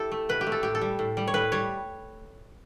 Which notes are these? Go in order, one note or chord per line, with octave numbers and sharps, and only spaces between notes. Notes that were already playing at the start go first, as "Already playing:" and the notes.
Already playing: E4 G4 A4
A3
B2 B4
G4
A3
A4
A2 G4
A4
G3
A2
G3
C#5
A2 B4
G3 C#5